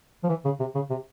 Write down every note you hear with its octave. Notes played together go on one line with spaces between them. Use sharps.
F3
E3
C#3
C3
C#3
C3